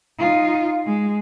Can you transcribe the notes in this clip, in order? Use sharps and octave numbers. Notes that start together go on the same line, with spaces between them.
D#4 F4
G#3